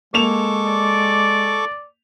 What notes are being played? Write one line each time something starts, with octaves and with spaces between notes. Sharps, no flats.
G#3 A#3 A4 C#6 D6 E7 F7
D5